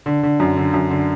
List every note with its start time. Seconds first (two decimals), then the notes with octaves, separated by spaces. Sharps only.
0.06 D3
0.23 D3
0.40 F#2
0.57 D3
0.74 F#2
0.91 D3